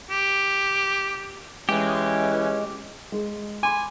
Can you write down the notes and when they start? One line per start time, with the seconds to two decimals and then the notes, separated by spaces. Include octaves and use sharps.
0.10 G4
1.69 E3 G#3 C#4 G4
3.12 G#3
3.63 G#5 B5 C6 D6